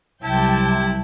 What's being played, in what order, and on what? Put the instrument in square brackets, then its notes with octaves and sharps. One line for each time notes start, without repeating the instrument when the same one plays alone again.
[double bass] C2 F#3 [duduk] C3 [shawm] E4 [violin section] G5 A5